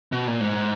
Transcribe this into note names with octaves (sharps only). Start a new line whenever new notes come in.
B2
A#2
G#2